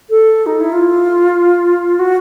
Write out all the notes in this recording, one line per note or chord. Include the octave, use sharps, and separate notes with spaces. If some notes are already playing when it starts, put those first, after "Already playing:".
A4
D#4
E4
F4
F#4